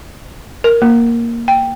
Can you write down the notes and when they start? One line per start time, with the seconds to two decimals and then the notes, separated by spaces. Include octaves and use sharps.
0.64 A#4
0.82 A#3
1.48 G5